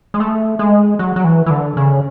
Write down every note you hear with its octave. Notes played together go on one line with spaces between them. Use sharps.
G#3
A3
G#3
F#3
F#3
E3
E3
D3
C#3